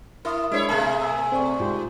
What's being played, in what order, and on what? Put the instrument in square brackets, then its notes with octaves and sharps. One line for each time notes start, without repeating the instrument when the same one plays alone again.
[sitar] E4 [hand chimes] A#4 E5 D#6
[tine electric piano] G#3 D4 C7 [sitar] E4 C5 C#5
[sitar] B2 A3 G#4 [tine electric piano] A#4 E5 F5 [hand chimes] A5
[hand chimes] G#5 B5 E6
[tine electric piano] C4 [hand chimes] C5 D5 C#6
[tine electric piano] G#2 G4 C6 [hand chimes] F4